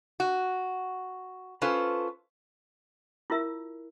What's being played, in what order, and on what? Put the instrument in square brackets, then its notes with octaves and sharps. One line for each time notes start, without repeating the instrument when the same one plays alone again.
[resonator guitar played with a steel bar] F#4
C#4 F4 A4 B4 C5
[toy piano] E4 F4 A#4 E5